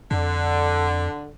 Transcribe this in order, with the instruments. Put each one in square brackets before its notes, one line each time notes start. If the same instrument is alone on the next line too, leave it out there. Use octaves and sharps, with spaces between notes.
[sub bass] F2 [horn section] D3